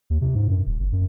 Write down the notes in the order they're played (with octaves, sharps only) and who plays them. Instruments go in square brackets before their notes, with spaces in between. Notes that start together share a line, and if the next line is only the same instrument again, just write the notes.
[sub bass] D#2
C3
G#2
F#2
D#1
F#1
F#2